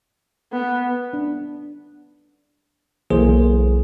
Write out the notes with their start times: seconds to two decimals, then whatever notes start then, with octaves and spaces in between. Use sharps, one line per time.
0.52 B3 F#5
1.13 D4
3.10 B1 E3 A#3 G#4 C5